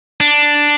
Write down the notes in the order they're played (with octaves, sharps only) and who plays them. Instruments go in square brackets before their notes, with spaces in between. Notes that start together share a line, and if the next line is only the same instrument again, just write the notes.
[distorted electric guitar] D4